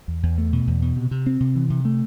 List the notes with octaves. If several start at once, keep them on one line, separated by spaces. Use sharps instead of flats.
E2
E2
A3
B2
E2
B2
C3
C3
C4
C3
E3
C3
A3